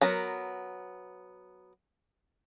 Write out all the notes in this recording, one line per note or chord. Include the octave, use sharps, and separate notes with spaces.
F#3 B3 A#4